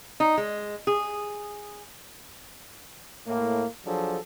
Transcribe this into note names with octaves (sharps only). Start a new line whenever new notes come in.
D#4
G#3
G#4
A2 A#3
F3 F#3 D4 G#4 A4